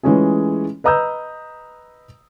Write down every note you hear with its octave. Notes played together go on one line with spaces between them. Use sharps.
E3 G#3 A3 C#4 F4 G#4
B4 D#5 A#5 D#6 E6 G6